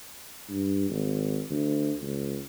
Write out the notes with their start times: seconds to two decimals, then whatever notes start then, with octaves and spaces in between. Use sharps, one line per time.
0.49 G2
0.90 G#1
1.50 D2
2.01 C#2